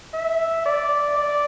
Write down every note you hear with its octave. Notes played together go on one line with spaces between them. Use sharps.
E5
D5
D5